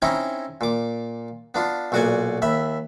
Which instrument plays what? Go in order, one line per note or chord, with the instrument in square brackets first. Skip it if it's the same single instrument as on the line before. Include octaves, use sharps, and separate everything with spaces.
[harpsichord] C4 C#4 D#4 E4 G5 A#5
A#2 D6
B3 D4 F4
B1 A#2 F#4 D5 F#5 G#5
D#2 E5 B5